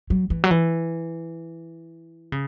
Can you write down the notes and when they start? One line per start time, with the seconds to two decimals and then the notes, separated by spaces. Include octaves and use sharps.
0.10 F#3
0.30 E3
0.44 F#3
0.51 E3
2.32 C#3